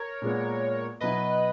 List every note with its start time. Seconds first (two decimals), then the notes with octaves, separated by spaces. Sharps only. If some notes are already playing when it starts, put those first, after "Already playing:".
Already playing: A#4 C#5
0.22 A#2 G#3 B3
1.00 B2 F#3 B3 E4 B4 D#5